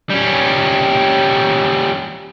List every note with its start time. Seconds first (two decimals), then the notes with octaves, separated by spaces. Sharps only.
0.10 G3 C#4